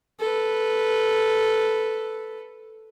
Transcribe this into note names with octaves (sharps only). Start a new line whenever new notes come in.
A4 B4